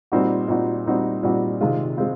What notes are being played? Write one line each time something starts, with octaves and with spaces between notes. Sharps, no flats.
A#2 G3 C4 D#4 F#4
A#2 G3 C4 D#4 F#4
A#2 G3 C4 D#4 F#4
A#2 G3 C4 D#4 F#4
C3 D#3 G#3 C4 F4
G#3 C4 F4